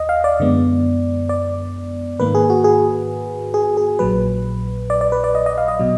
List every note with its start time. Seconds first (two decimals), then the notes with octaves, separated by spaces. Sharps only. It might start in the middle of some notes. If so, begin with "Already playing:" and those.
Already playing: D#2 D#5
0.09 F5
0.24 D5
0.39 F#2 D3 G#3 B3
1.29 D5
2.19 G#2 D#3 A#3 B4
2.35 G#4
2.50 F#4
2.64 G#4
3.54 G#4
3.77 G#4
3.99 A#1 A#2 F#3 B4
4.90 D5
5.01 D5
5.12 B4
5.24 D5
5.35 D#5
5.46 D#5
5.58 F5
5.68 D#5
5.79 B2 F#3